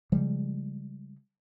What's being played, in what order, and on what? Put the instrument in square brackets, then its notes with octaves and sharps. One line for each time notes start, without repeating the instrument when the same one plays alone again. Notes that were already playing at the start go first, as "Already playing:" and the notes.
[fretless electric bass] C#3 F3 G3 G#3